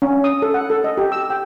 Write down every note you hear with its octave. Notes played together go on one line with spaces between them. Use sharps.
C#4
D#6
A4
F#5
A4
D#5
G4
E6
G5